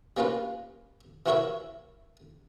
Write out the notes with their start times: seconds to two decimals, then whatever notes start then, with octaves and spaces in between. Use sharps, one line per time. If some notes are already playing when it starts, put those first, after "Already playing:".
0.17 G3 A#3 C#4 F4 B4
1.26 E3 E4 F#4 A#4 C#5 E5